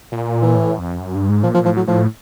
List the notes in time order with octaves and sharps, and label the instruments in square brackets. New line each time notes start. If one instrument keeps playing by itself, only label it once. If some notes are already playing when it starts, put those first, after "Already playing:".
[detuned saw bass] A#2
[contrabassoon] E3
[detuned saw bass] A2
F2
F#2
G2
G#2
[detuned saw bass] A#2 [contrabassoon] F3
[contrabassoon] F3
[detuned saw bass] A2 [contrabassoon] F3
[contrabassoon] F#3
[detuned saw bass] A2 [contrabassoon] F3